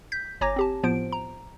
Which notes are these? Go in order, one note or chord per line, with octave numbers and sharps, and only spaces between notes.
G6 B6
G1 C#5 G#5 A#5 D6 A#6
C4 G4 A5
A2 F3 B3 F4 C5 D7
A#5